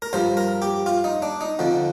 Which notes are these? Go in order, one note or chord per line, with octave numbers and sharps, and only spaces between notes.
A#4
G2 F3 C5
A#4
G4
F4
D#4
D4
D#4
F2 D3 F3